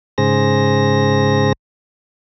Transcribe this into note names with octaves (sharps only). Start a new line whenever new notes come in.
G#2 C#3 G#4 C5 A#6